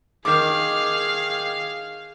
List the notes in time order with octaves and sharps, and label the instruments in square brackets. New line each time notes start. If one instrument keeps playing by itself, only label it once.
[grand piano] D#3 D6 [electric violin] G#4 F5